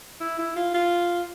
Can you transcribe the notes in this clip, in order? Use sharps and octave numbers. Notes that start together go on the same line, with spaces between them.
E4
E4
F4
F4